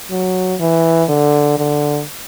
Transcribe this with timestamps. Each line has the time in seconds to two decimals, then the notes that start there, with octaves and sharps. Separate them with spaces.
0.10 F#3
0.60 E3
1.09 D3
1.58 D3